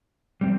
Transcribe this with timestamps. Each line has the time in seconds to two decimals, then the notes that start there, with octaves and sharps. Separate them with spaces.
0.41 G3 C4